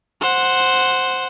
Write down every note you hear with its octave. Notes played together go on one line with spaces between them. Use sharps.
C5 F#5